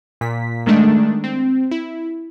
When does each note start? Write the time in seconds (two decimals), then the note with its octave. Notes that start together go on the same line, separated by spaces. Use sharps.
0.21 A#2 B6
0.66 D#3 G#3 A3 D4
1.24 C4
1.71 E4